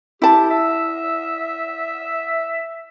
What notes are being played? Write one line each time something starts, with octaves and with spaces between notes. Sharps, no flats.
E4 G4 A5
E5